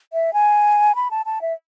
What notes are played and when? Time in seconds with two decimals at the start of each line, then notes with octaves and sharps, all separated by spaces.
0.13 E5
0.33 G#5
0.95 B5
1.11 A5
1.26 A5
1.41 E5